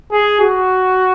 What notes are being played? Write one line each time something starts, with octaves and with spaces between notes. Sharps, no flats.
G#4
F#4